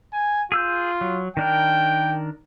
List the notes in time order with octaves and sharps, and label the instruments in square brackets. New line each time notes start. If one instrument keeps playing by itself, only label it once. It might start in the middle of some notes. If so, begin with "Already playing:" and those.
[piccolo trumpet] G#5
[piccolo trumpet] F4 [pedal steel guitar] G#4 E6 G6
[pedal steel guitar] F#3
[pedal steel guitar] D#3 D4 A#4 [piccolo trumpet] G5